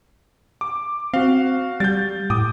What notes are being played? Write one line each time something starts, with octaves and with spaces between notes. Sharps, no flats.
D6
C4 F#4 F5
G3 G6 A6
A2 D6 D#6